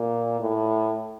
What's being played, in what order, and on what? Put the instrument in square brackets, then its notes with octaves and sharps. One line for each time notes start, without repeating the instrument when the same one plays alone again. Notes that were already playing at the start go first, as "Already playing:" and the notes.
Already playing: [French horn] A#2
A2